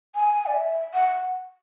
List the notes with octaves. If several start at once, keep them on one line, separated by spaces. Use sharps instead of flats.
G#5
D5
E5
F#5